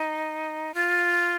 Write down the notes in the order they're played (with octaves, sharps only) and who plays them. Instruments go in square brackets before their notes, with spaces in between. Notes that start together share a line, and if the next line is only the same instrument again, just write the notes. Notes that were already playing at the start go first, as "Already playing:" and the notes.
Already playing: [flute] D#4
F4